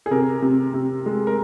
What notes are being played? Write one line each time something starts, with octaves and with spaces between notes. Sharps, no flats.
G#4
C3 A#4
C3
C3
G#3
A#4